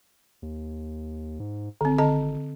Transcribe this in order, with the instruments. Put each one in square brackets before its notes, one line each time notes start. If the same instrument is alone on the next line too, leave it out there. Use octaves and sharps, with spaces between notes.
[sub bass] D#2
G#2
[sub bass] G#1 [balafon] D3 C4
[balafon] D3 D#5 A5